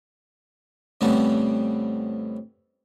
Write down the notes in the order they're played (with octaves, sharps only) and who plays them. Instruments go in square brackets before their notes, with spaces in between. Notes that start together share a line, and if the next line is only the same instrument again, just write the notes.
[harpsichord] F2 A2 C#3 G3 A3 B3